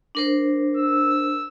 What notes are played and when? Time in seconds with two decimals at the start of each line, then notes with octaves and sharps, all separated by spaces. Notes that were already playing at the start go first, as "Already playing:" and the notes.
0.15 D4 A#4 C5
0.77 E6